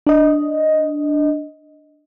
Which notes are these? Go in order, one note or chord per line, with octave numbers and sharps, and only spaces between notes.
D4 D#5